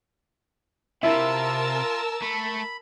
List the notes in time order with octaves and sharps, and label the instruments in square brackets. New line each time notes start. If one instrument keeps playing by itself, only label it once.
[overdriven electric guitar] C3 [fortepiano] E4 [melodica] F4 [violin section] A#4 A5 E6
[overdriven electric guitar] A3 [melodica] B5